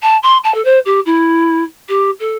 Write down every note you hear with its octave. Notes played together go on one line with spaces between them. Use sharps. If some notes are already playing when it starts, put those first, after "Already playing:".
A5
C6
A5
A4
C5
G4
E4
G4
A4